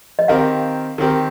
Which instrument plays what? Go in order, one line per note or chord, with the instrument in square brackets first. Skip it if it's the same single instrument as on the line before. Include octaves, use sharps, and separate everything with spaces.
[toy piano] D#5
[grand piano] D#3 C4 G4 A#4 [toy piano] F5
[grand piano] D#3 C4 G4 A#4